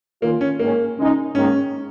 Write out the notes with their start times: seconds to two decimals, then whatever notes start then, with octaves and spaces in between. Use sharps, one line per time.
0.22 D#3 A#3 C#4 F4
0.41 C#4
0.59 G#2 D#3 A#3 C#4
0.98 C#3 G#3 D#4
1.35 G#2 D#3 A#3 C#4